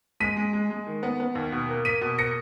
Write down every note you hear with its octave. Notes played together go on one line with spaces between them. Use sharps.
G#3 B6 D#7
G#3
G#3
G#3
D#3
B3
B3
D#2
B2
A#3
A#3 B6 D#7
B2
A#3 A#6 C#7